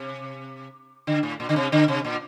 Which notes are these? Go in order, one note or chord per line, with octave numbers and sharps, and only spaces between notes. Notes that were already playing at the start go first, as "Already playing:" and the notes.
Already playing: C3
D3
A2
A#2
D3
C3
D3
C3
A#2